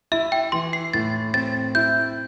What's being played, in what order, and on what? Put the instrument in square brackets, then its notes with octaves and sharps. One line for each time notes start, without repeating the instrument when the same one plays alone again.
[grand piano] E4 [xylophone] E5
[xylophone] G5
[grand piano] E3 [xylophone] C6
[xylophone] C7
[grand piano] A2 [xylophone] A6
[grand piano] C4 [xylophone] A6
[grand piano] E4 [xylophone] G6